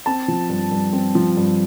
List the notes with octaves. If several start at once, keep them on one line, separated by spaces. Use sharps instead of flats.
C4 A5
F3
G2
G2
C4
F3
G2